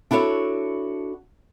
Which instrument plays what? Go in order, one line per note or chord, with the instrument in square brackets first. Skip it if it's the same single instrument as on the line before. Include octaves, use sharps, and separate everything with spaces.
[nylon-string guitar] D4 E4 F#4 A4 C#5